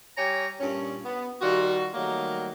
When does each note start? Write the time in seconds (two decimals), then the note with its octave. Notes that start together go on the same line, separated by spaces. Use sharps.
0.17 G3 G4 C#5 G#5 A#5
0.60 G2 A#2 C#4
1.05 B3
1.42 D#3 G3 F4 F#4
1.94 D#3 F#3 G3 A3 A#3